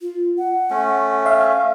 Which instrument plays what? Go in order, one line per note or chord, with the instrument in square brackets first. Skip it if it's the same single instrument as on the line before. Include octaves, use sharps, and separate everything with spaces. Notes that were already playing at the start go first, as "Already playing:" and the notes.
[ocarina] F4
F#5
[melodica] A3 C#4
[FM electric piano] E5 F5